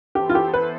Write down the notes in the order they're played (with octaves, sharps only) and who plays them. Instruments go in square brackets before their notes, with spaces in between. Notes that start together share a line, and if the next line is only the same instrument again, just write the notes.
[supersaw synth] E3 B3 E4 A4 C5 [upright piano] G4
[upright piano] F4
G4
B4